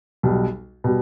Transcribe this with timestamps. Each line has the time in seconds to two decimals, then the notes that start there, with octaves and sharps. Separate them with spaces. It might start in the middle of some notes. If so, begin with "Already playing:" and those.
0.23 B1 B2 G3
0.84 B2 G3